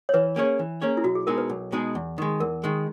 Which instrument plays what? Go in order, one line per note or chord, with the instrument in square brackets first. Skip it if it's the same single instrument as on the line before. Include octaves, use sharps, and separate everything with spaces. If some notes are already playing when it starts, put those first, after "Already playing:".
[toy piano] C#5
[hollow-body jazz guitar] E3 [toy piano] B4
[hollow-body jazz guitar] A#3 C#4 G#4 C#5
E3
A#3 C#4 G#4 C#5
[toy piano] E4
[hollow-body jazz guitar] B1 [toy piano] F#4
[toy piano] G#4
[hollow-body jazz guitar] B2 G#3 D#4 G#4 [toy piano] A#4
[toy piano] B4
[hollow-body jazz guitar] B1
B2 G#3 D#4 G#4
E2
D#3 G#3
[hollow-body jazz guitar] E2 [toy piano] A#4
[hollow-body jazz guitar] D#3 G#3